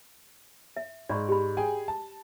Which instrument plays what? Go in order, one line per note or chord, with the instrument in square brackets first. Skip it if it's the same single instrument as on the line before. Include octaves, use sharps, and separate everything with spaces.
[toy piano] E5
[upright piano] G#2 [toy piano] D5 B5 C#6
[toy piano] G4 B5
[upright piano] G#4 G5 G#5
A5